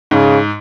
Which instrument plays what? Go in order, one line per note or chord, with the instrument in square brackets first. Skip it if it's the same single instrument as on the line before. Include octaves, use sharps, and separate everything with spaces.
[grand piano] G#2 [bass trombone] C#3